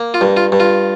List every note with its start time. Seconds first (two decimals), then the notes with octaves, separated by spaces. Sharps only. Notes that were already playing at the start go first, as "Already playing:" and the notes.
Already playing: A#3
0.14 F4
0.21 G2
0.37 F4
0.52 G2
0.60 F4